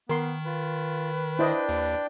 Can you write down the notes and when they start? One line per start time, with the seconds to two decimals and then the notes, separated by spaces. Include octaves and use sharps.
0.10 D#3 B3 A#4 C6
0.46 F4 B4
1.39 D4 E4 C5 D5 D#5 G5
1.69 D#2